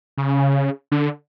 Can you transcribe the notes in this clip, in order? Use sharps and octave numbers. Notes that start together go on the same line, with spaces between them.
C#3
D3